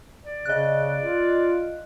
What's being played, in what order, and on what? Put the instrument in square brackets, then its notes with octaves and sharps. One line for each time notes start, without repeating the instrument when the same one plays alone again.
[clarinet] D5
[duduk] C#3 [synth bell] D#5 F#6
[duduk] F4